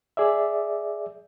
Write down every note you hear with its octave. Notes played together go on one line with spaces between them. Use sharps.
G#4 D5 E5